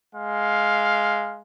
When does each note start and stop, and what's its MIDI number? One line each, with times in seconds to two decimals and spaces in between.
0.15 1.41 56
0.15 1.41 77